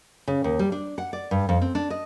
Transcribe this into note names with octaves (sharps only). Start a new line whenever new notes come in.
C#3
D#2
G3
D4
F#5
D5
G2
F2
C4
D4
D#5